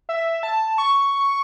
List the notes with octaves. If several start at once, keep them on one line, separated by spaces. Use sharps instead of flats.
E5
A5
C#6